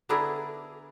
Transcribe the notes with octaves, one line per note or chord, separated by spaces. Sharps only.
D3 B3 D4 E4 G#4 A#4